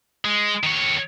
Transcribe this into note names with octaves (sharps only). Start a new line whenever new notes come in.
G#3
D#3 C#5